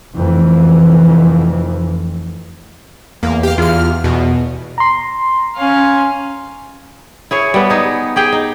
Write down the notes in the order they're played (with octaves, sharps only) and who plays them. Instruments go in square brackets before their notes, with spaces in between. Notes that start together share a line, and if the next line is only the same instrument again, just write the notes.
[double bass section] F1 F2 E3
[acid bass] E2 [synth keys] A#3
[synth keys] G4 F5
[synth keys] E2 F6 [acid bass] F4
[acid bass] E2 [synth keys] B2
[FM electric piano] A#5 C6
[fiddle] C#4 F5
[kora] E4 G#4 C#5
G3 B3
D#4 G#4
G4 G#4 G5
D#4